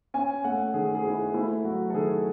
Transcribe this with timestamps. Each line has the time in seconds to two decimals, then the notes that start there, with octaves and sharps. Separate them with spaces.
0.14 C#4 G#5
0.44 A3 F#5
0.74 D#3 G#4
0.95 G#4
1.05 E4
1.34 A3 E4
1.65 F#3 F#4
1.90 A4
1.94 D#3 G#4